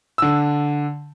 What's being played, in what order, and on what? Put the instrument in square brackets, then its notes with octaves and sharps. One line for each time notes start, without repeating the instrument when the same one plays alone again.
[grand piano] D3 E6